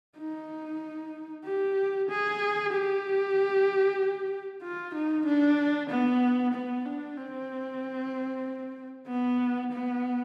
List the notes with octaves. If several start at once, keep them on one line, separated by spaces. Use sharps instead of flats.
D#4
G4
G#4
G4
F4
D#4
D4
B3
B3
D4
C4
B3
B3